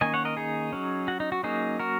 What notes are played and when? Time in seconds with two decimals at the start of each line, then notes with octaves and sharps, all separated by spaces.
0.01 D#3 A#3 C#4 D#5 G#5
0.14 C#5 F#5
0.25 A#4 D#5
0.37 D#4 G#4
0.73 F#3 C#4
1.08 F#4
1.20 D#4
1.32 F#4
1.43 F#3 A#3 C#4 D#4 G#4
1.79 F#4 A#4